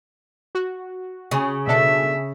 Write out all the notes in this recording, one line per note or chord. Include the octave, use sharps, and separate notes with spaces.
F#4
C#3
B2 D4 A4 E5